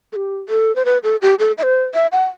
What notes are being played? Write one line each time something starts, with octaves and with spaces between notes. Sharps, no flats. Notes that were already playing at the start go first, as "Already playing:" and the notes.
A4
G4
A4
C5
B4
A4
G4
A4
E5
C5
E5
F#5